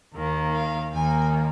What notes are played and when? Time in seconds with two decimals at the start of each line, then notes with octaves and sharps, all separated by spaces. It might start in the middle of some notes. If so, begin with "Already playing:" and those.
0.13 D#2 D#3 A#3
0.54 F5
0.94 D#2 D#3 A#3 G#5